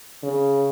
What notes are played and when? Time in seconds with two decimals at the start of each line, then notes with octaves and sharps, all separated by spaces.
0.23 C#3